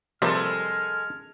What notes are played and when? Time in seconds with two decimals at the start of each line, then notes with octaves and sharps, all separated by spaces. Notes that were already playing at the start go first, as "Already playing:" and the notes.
0.22 C3 F3 G3 G#3 A#3 A4 B4 F6